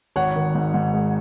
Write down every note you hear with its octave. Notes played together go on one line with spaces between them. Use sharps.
G#1 C#5 F#5
D#3
G#2
G#2
G#3